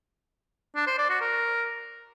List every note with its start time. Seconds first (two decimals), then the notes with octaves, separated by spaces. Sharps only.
0.75 D4
0.87 C5
0.98 D5
1.10 F#4
1.21 A#4